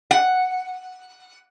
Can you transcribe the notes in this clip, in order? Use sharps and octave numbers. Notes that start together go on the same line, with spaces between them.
F#5